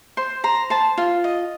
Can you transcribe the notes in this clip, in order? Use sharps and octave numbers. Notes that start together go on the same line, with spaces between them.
C5 C6
C5 A#5
C5 A5
F4
D#5